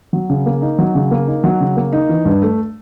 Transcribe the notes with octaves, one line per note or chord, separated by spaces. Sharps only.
F#3
C#3
A#3
D#4
F#3
C#3
A#3
D#4
F#3
C#3
A#3
D#4
E3
G2
A3